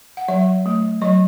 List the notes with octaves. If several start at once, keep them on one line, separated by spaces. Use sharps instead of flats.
F#5
F#3 E5
A3
F#3 D#5